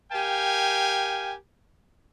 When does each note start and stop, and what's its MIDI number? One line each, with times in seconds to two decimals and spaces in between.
0.12 1.35 67
0.12 1.35 70
0.12 1.35 77
0.12 1.35 79
0.12 1.35 80